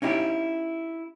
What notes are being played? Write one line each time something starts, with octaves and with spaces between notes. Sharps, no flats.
C#4 D#4 E4 G4